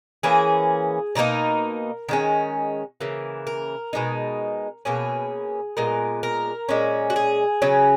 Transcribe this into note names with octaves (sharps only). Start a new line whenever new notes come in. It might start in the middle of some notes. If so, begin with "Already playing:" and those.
E3 A#3 C#4 G#4
B2 F#3 A#3 D#4 A#4
D#3 G#3 C#4
C#3 E3 A#3
A#4
B2 G#3 D#4
B2 A#3 C#4 G#4
A#2 G#3 B3 A#4
A#4
A#2 G#3 C#4
F#4
G#4
C#3 F#3 C#4